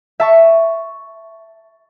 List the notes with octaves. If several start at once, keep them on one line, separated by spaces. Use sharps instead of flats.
E5 A5 C#6